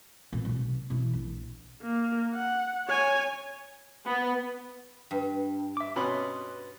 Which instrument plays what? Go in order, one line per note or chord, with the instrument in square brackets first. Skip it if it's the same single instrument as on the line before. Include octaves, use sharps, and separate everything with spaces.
[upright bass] A#2 B3
B1 C3
B2 E3
A#1
[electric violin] A#3
F#5
C#5 G#5
[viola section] B3
[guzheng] G2
[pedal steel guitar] E5 D6
[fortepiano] B2 C#4 B5 [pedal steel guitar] B4 C6 D#6